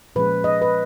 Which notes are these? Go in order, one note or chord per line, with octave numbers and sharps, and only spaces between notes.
A#2 F3 G#3 C#4 B4
D#5
B4